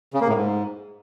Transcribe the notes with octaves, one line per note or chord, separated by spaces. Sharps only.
C#3
A#3
A2
G#2